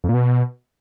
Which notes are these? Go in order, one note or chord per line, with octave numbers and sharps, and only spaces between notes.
F2
A#2
B2